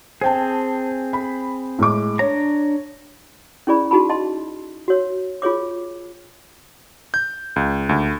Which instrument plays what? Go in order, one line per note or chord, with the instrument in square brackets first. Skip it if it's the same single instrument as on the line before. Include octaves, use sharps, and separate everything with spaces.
[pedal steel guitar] C4 G#4 [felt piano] C5 G5 A5
[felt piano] B5
A2 G#3 D6
[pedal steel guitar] D4 A#5 [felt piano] C#5
[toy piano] C#4 E4 G#4 D5 B5
D#4 F#4 G#4 A5 B5
D#5 A5 C6
F#4 C#5
F4 G#4 C#5 D6
[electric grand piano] G6
C#2
D2